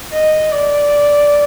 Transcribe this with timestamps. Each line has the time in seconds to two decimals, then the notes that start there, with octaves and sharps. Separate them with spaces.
0.13 D#5
0.52 D5